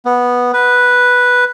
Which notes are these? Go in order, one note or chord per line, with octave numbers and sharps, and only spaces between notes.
B3
B4